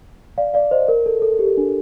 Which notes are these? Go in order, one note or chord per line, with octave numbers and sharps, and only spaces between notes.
D5 F5
D5 F5
C5 D#5
A#4
A4
A4
G4
D4